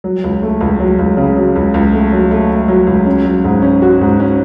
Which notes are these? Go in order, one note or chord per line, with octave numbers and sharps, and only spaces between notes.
F#3
C#2
A3
C#2
F#3
C#2
C#3
F#3
C#2
C#2
A3
F#3
A3
A3
F#3
C#2
C#4
F#3
G#2
C#4
F#4
G#2
C#4